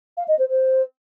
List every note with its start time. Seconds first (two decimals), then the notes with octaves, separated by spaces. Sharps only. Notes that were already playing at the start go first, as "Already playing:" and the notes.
0.17 F5
0.28 D#5
0.39 C5
0.49 C5